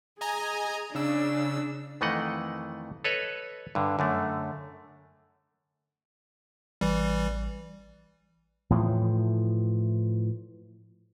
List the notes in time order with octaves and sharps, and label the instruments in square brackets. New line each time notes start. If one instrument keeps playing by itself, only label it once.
[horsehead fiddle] G#4 [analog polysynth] D#5 G#5 A#5
[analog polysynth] C#3 E6 [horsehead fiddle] D4
[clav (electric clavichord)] F2 D#3 E3 A3 D#5 F#5
A4 B4 C#5 D#5
G2 D3
F#2 D3 A3
[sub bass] A1 [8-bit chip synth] E3 G3
[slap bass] A2 E3 F3